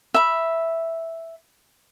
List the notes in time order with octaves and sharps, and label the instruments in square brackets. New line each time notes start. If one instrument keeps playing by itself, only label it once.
[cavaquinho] E5 B5